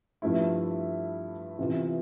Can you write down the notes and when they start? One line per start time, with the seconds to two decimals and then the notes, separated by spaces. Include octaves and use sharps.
0.22 G2 F3 A3 E4
1.59 C3 E3 B3 F4